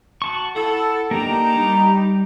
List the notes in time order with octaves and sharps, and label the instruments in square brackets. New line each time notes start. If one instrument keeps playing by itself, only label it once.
[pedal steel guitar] F#4 A5 C#6
[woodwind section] E4 A5 [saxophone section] A4 [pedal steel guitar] F#5 E6
[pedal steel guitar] A#3 D4 [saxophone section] D#4 G4 [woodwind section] A#5
[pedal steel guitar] G3